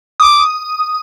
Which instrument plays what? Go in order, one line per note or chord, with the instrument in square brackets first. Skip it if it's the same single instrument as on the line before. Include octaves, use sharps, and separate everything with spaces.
[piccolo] D6 [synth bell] D#6